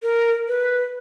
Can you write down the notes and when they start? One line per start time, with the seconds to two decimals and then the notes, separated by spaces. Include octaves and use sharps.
0.03 A#4
0.48 B4